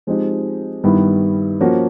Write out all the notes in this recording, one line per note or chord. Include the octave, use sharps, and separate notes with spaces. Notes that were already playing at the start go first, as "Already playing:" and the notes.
F3 G#3 C4 D#4 G4
G2 D#3 G3 B3 E4
F3 A#3 C#4 F#4